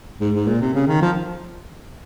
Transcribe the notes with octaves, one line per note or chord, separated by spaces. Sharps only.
G#2
G#2
A#2
C3
C#3
D#3
F3